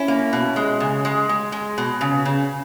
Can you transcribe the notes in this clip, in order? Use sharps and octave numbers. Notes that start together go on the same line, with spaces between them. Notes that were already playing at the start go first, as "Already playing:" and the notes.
Already playing: C#4 E4
A#3
B2
G#3
C#3
G#3
G#3
G#3
B2
C#3
C#3